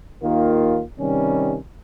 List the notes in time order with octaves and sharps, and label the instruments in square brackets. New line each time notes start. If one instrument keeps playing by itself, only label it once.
[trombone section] D#2 D#3 A#3 F4
C3 D#3 G3 C#4